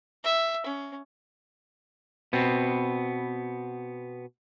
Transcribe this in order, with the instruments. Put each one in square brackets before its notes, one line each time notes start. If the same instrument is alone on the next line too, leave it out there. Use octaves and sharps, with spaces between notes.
[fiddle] E5
C#4
[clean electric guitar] B2 B3 C4